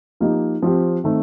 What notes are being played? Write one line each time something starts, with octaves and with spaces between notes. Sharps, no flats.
F3 A#3 D#4 G4
F3 C4 G4
D#3 A3 C4